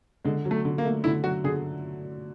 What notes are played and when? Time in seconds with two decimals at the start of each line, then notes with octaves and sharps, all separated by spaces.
0.25 D3 G#3
0.45 F#3
0.51 A3
0.65 D3
0.78 A#3
0.85 A3
1.04 D3 E4
1.24 F#3 F#4
1.44 D3 G#4